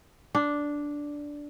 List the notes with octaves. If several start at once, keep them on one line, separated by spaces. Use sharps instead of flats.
D4